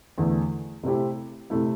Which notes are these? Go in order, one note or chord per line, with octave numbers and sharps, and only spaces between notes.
E2 D3 A3
C3 A3 C4 E4 G4
C3 A3 E4